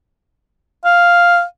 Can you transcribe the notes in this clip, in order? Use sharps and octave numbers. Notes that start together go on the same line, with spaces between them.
F5